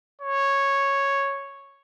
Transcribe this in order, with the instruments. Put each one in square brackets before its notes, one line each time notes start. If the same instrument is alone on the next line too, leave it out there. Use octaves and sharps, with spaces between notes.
[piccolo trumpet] C#5